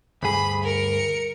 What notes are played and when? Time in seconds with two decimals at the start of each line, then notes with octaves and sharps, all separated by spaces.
0.23 D2 G2 G#4 B5
0.64 A#4 C#7